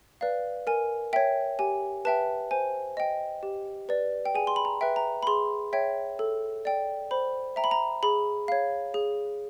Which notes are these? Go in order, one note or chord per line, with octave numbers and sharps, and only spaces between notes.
B4 D5 F5
A#4 G#5
C#5 E5 G5
G4 G#5
B4 E5 G5 A5
C5 G#5
D#5 G5
G4
B4 D5
G5
G#4 G#5
C6
B5
A#5
B4 E5 G5
A#5
B5
G#4 C6
C#5 E5 G5
A4
D5 G5
C5 B5
E5 G5 A#5
B5
A#5
G#4 B5
C#5 F5
G#4